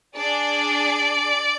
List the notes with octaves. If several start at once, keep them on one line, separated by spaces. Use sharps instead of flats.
D4 G#4 D5